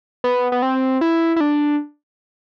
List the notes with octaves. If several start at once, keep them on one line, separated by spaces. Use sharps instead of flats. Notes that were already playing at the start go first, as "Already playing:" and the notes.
B3
B3
C4
E4
E4
D4